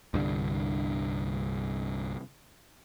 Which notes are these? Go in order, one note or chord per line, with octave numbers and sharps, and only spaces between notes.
C2 G2 D3